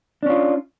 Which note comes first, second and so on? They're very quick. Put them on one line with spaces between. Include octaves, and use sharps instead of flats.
D4 C#4 F4